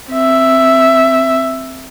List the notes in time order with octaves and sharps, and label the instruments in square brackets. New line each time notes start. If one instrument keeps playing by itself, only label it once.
[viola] C4 E5